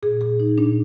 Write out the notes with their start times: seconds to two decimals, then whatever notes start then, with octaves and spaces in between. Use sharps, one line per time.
0.03 A#2 G#4
0.21 A#2 G#4
0.40 A#2 D#4
0.58 A#2 D4